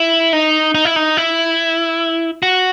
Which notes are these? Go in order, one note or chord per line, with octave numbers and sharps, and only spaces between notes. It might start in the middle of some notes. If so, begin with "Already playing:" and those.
Already playing: E4
D#4
D#4
E4
D#4
E4
F#4